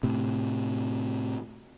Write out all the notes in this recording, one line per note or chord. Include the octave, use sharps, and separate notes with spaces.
A2 C3